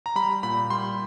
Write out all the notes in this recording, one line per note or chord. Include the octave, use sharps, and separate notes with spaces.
A#5
G3 B5
A#2 B5
G3 C6